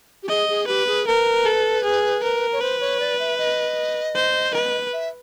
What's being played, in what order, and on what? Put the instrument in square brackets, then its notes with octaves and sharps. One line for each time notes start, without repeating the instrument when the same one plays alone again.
[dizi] G4
[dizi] G#4 [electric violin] D#5
[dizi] G#4
[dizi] G4 [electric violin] B4
[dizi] G#4
[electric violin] A#4 [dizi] B4
[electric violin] A4
G#4
A#4
[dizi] C#5
[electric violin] B4 [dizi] C5
[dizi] C#5
D5
E5
D#5
[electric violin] C5
B4
[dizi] E5